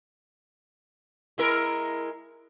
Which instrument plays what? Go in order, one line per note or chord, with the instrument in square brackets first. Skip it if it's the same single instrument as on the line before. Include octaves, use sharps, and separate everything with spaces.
[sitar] G#3 E4 A#4